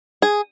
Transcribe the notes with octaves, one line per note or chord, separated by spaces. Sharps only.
G#4